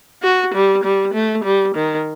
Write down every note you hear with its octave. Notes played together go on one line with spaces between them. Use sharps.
F#4
G3
G3
A3
G3
D#3